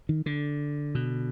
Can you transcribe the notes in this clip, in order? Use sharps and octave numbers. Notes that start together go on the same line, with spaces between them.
D#3
D3
B2